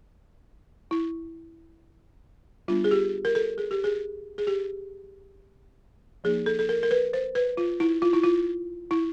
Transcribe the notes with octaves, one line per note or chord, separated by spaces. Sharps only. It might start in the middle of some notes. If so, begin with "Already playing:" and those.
E4
G3 B3 D4 F4
G#4
G4
A#4
A4
G#4
G4
G#4
G#4
G4
F3 A#3 D#4 G#4
A4
A4
A#4
A#4
B4
C5
B4
F4
E4
F4
E4
F4
E4